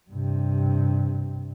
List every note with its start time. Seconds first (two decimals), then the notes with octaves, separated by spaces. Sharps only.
0.10 G2 C3